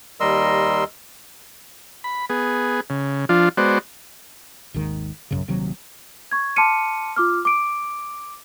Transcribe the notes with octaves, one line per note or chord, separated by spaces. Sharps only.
D#2 G3 A#4 D#5 C6 E6
B5
B3 G#4
C#3
F3 D4 F4
G#3 B3 F#4 C5 D5
G#1 D#2 G#2 D#3
A#1 F#2 C#3
D#1 D#2 C3 F#3
C#6 G#6
A5 C6 D6 F6 C#7 D#7
F4 D6 F6
D6 D7